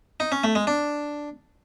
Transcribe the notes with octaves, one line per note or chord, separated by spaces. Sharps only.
D#4
C#4
A3
G#3
D4